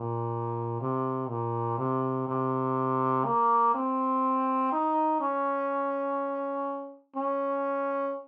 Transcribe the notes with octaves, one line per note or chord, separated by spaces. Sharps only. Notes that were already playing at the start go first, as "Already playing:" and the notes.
Already playing: A#2
C3
A#2
C3
C3
A#3
C4
D#4
C#4
C#4